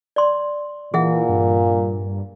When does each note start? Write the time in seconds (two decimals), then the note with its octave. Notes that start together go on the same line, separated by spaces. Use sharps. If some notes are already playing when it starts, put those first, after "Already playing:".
0.16 D5 C6
0.94 A#2 E3 G#4 E5 F#5
1.29 G2